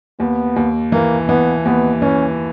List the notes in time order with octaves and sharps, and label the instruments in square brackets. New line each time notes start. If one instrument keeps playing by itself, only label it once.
[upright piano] D#2 [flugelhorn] B3
[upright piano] D#2
[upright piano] E3 [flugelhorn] A#3
[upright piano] E3 [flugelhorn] B3
[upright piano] D#2 [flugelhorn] B3
[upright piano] E3 [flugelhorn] C#4